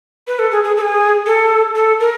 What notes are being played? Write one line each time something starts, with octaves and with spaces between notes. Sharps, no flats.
B4
A4
G#4
G#4
A4
G#4
A4
A4
A#4